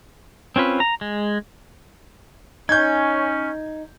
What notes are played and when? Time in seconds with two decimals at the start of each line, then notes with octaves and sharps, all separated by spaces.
0.56 C4 C#4 F4 B4
0.80 A#5
1.01 G#3
2.69 C#4 D#4 G6 G#6